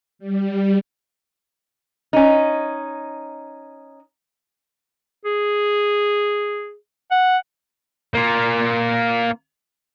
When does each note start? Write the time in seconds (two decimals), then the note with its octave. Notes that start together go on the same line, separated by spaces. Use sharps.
0.19 G3
2.13 C#4 D#4
5.25 G#4
7.11 F#5
8.14 A#3 F4